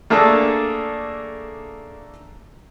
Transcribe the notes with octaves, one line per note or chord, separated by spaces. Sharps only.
A3 A#3 D4 G#4 A4